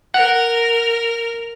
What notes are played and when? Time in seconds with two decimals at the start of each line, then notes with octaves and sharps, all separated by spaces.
0.14 A#4 F#5 F6